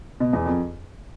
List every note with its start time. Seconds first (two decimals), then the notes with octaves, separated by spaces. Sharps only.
0.20 B2
0.33 E2
0.45 F2